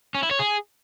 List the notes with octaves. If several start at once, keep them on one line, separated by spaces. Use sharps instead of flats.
C#4
E4
C#5
G#4